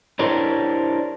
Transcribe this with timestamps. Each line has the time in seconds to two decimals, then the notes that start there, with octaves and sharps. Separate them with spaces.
0.19 D4 E4 G4 A#4 C5 C#5